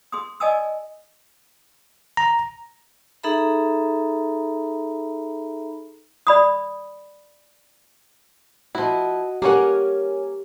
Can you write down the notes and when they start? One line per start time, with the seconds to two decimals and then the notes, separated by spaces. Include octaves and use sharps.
0.12 G#4 C6 D#6
0.40 D5 D#5 G#5 A5 D#6 E6
2.17 A#5
3.23 D#4 G#4 A4 E5 A#5 B5
6.27 D5 B5 D#6
8.75 F3 E4 F#4 D#5
9.42 A#3 C#4 G4 A#4 C#5 F#5 G#5